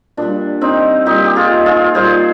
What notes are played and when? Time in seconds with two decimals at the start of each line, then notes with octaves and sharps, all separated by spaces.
0.17 A#2 G3 D4
0.61 C4 D#4
1.06 A#2 G3 D#4 G4
1.25 G4
1.36 F4 G#4
1.66 F4 G#4
1.95 A#2 G3 G#4 C5